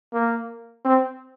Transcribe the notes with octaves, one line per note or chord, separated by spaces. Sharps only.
A#3
C4